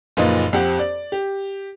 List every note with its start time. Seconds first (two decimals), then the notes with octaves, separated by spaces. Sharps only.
0.17 F#1 A#2 F3 D#4 B4 D#5
0.53 F2 C4 G4 F#5
0.79 D5
1.12 G4